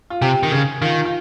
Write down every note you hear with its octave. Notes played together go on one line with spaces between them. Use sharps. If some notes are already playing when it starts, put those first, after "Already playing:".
F4
C3 G4
D#3
C#3 G#4
D#3 F4
F4